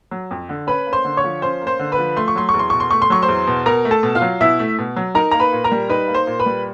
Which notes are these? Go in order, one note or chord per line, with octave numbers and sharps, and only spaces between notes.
F#3
F2
D3
C#4 B4 B5
A#3
C5 C6
D3
C#5 C#6
F3
C#4 C5 C6
A#3
C5 C6
D3
B4 B5
F3
A3 C6
C#6
F#3 C6
C#6
E2
C6
B2 C#6
C6
A3 C#6
C6
F#3 C#6
C5 C6
E2
B2
B2 A#4 A#5
A3
A4 A5
B2
F4 F5
F#3
B2 E4 E5
A3
B2
F#3
D#4 A#4 A#5
A#3 A#5
B4 B5
A#2
A#4 A#5
G3
D#4 B4 B5
A#3
C5 C6
A#2
B4 B5
G3